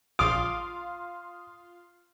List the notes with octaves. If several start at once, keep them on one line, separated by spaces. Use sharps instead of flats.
A#1 F4 F5 C6 D6 D#6